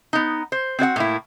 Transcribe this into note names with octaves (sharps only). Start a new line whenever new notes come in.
B3 D#4
C5
C4 F#4 D5 F#5
A2 A#3 E4